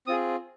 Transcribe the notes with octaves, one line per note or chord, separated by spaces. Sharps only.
C4 F4 G#4 D#6